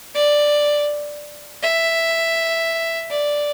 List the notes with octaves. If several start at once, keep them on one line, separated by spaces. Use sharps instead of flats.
D5
E5
D5